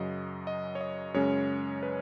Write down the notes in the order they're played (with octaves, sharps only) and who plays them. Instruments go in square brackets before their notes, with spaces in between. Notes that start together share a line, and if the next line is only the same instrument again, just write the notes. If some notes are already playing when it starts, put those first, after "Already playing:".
Already playing: [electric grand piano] F#2 C#3 F#3 D#5
D#5
C#5
D#5
F#2 C#3 G#3 C#4 C#5
B4